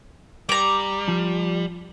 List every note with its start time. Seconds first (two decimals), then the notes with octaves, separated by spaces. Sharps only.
0.49 G3 A#5 D6
1.08 F3